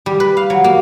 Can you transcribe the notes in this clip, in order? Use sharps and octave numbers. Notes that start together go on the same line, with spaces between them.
G3
B4
F5
F#3
A#3